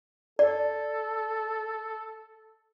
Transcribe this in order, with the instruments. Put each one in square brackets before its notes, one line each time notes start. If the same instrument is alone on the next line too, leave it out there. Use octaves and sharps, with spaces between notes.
[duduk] A4 [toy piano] D5